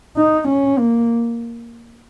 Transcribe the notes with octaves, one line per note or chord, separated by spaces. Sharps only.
D#4
C#4
A#3